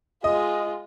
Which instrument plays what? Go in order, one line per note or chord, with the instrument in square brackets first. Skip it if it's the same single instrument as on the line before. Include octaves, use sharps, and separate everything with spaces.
[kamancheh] G#3 F4 [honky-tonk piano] D#5